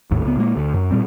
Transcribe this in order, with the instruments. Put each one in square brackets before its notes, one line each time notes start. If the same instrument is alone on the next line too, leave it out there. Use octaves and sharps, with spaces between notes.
[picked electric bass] G#1 D#2 A2
C#2 B3
A#2 G#3 A#3
D2
F#2
A#2 G3 C4